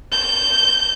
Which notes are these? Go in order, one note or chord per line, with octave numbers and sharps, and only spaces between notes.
G6